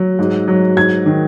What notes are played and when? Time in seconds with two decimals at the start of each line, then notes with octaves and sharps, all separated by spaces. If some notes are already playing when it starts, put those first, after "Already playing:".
Already playing: F#3
0.19 G#2
0.48 F#3
0.77 G#2 G#6
1.06 D#3